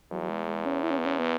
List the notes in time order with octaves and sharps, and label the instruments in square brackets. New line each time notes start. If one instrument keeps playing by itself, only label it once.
[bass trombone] E2 [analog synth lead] F#3
[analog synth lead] F#3
G#3
G#3
C#4
E4
C#4
B3
C#4
B3